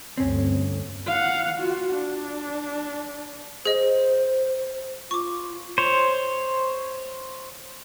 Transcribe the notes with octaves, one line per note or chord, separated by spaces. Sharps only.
G1 D2 C4 C#4
F5 F#5
F4 F#4
D4
G#4 C5 D#5
F4 C#6 D6
C5 C#5